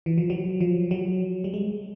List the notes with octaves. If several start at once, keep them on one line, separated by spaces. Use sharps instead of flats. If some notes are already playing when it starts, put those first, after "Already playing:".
E3
F3
F#3
F3
F#3
G3
G#3